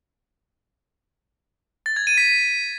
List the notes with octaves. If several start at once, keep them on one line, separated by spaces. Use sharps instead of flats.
A6
G#6
D#7
B6